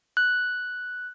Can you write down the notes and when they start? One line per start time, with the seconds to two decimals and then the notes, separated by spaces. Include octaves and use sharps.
0.17 F#6